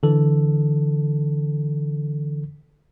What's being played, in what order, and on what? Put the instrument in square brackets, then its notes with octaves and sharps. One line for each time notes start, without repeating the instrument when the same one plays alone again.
[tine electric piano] D3 E3 A4